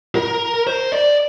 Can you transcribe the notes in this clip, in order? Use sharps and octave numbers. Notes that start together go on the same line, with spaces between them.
A#4
C5
D5